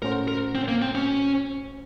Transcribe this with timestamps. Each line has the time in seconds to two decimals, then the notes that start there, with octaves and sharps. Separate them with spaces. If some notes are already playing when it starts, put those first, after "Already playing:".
0.02 A2 A3 C#4 F#4 A#4 C5
0.28 A#4
0.55 C4
0.68 A#3
0.82 C4
0.95 C#4